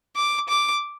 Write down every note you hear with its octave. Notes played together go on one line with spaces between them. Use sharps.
D6
D6